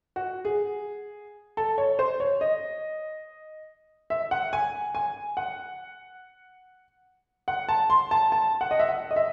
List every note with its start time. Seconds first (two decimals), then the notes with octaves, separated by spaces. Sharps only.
0.16 F#4
0.45 G#4
1.57 A4
1.78 C#5
1.99 C5
2.20 C#5
2.41 D#5
4.10 E5
4.31 F#5
4.53 G#5
4.95 G#5
5.37 F#5
7.48 F#5
7.69 A5
7.90 C6
8.11 A5
8.32 A5
8.61 F#5
8.71 D#5
8.80 E5
8.88 F#5
9.11 D#5
9.16 E5